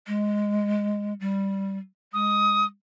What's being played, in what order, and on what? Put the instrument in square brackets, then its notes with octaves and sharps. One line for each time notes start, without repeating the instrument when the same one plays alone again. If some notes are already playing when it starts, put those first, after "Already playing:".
[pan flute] G#3
G3
[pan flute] G#3 [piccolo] D#6